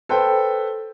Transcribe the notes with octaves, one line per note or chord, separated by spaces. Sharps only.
A4 B4 C5 G5